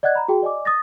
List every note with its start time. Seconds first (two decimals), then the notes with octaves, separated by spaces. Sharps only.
0.03 D5 D#5 F#5 F#6 G#6
0.15 A#5 B5
0.28 F#4 G#4 G5
0.42 D5 D#5 G#5 D6
0.65 D#6 A6 A#6